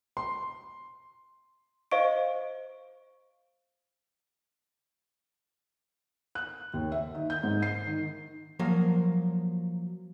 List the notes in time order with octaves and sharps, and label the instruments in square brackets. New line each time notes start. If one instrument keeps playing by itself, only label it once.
[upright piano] C6
[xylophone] C5 D#5 F5 C#6 D7
[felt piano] F#6
D#2
E5
D#3
G6
G#2
C7
D#3
[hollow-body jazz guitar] F3 F#3 A#3